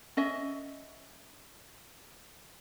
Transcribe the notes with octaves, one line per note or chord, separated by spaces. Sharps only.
C#4 D#5 E5